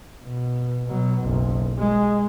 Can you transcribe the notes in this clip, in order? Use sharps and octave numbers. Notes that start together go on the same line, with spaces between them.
B2
B2 F#3
F#1 B1
G#3